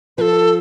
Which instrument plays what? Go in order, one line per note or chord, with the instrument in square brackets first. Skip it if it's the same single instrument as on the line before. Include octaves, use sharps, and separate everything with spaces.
[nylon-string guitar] F3 [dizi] A4 B4